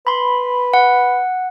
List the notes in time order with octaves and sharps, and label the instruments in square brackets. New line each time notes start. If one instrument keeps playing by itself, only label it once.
[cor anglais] B4 [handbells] B5 C6
[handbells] F#5